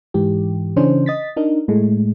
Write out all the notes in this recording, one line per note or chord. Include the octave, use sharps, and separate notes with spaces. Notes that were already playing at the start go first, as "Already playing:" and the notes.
G#2 E3 G4
C#3 E3 C#4 D4 C5
D#5 A6 B6
D4 D#4 A#4
A2 G#3 A3